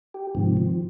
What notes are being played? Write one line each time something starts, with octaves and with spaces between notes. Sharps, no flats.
G4
G#2 C3 D#3 F3
F3